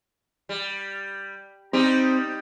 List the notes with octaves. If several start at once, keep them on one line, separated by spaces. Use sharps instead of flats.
G3
G3 C4 D#4 G4